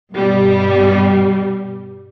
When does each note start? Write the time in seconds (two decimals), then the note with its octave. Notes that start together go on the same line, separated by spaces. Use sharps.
0.12 G2 B2 G3